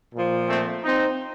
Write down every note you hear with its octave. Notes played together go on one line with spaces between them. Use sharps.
A#2 F3
A3 C4
C4 D#4